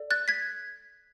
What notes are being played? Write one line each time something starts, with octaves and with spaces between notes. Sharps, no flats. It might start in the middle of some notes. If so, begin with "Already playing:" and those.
Already playing: A4 D5
F#6 A6
G#6 B6